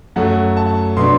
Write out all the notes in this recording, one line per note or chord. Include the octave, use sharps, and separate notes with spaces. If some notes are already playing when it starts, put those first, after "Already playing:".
F#2 F#3 A3 F#5
A5
B2 F#3 B3 D4 C6